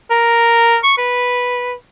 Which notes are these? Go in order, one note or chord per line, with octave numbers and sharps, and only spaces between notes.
A#4
C#6
B4